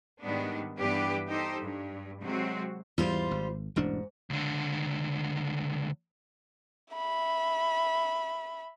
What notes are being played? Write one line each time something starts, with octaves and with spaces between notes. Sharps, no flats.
G#2 D#3 G3 B3 D4
G2 E3 B3 D4 G4 B4
D#4 G4 A4 C5
G2
C3 F#3 G#3 C4 F#4
E2 G#2 E3 G3 F4 C5
G#1
E1 A1 G#2 D4
C#2 D3
E5 B5